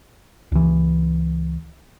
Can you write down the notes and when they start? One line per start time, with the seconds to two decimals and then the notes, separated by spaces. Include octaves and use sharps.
0.52 C#2 E3